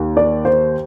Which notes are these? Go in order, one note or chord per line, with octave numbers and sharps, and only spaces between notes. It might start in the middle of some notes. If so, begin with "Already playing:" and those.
Already playing: D#2
D5
C5